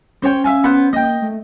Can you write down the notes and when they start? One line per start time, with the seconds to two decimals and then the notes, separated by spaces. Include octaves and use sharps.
0.23 C#4 C5 C#5 G5
0.44 E5 F5 G#5
0.64 B3 B4 C5
0.93 A#3 D#5 G5
1.22 A3